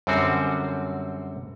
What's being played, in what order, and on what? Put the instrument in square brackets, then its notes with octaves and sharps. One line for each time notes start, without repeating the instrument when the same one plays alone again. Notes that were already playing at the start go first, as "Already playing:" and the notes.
[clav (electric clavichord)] F#2 D3 G3 C4 F#4